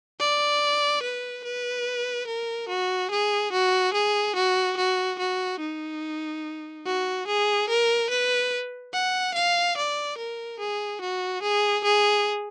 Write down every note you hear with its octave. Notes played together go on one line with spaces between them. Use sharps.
D5
B4
B4
A#4
F#4
G#4
F#4
G#4
F#4
F#4
F#4
D#4
F#4
G#4
A#4
B4
F#5
F5
D5
A#4
G#4
F#4
G#4
G#4